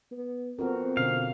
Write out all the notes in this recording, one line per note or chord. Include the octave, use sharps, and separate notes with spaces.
B3
F2 B3 C4 F#4 A#4
B2 D3 C#4 F5